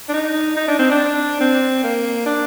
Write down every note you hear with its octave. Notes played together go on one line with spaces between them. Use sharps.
D4
D#4
D#4
D4
C4
D4
C4
A#3
D4